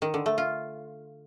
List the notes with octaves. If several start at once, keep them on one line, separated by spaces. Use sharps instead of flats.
D#3
D3
A3
F4